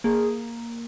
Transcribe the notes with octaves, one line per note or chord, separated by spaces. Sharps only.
A#3 G#4